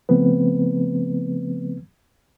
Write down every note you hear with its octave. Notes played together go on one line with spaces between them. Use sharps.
C#3 F3 A3 B3 C4 B4